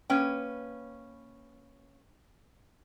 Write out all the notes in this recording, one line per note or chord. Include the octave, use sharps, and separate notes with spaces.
A#3 C#4 B4 G5